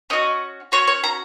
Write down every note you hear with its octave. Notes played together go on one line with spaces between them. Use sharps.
C#4 F#4 D#5
C#4 F#4 C#5
C#5
A#5